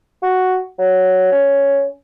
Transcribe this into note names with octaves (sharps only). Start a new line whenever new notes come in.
F#4
F#3
C#4